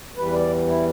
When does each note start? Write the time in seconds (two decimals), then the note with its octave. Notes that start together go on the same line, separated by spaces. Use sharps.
0.17 E2 E3 G3 B4
0.34 D5
0.67 E4